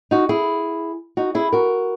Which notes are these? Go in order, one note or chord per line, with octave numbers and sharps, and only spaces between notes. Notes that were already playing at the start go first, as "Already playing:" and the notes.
D#4 F#4
E4 G#4
D#4 F#4
E4 G#4
F#4 A#4